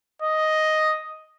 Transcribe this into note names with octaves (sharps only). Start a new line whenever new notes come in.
D#5